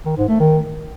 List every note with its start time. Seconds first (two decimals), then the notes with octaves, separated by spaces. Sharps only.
0.06 D#3
0.17 G#2
0.29 A3
0.40 D#3